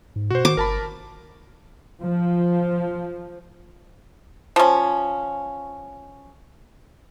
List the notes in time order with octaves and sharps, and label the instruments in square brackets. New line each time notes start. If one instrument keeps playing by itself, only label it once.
[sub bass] G#2
[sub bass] B2 [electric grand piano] F#4 C5
[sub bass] D#3 [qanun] D6
[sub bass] G1 [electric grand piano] A#4 A5 B5
[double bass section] F3
[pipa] F3 C#4